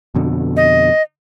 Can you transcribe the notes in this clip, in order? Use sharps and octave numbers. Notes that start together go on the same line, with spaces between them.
F2 B2 D3
D#5